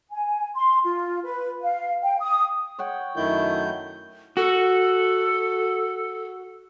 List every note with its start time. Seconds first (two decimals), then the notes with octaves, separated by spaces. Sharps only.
0.12 G#5
0.54 C6
0.84 F4
1.24 B4
1.63 F5
2.03 G5
2.21 D#6
2.79 C#5 F#5 G5
3.17 F#2 D#3 A3 E4 G6
4.37 F#4 A4